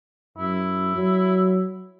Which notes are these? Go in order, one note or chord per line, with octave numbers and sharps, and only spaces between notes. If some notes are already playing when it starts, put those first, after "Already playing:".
F#2 E4
F#3